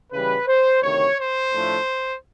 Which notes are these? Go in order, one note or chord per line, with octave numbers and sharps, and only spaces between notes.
C#3 E3 G3 B4
C5
D2 C3 D#3 C#5
C5
A2 F3 A3 D4